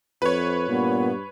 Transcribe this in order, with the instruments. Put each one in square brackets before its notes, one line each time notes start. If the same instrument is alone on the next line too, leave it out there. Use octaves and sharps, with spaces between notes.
[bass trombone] F2 [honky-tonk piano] B4 C#5
[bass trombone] G2 [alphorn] A#2 [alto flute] B3